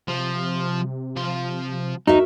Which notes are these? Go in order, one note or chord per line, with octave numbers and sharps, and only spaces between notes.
C3 F3
F3 C6
D#2 D#4 F#4 A#4 E5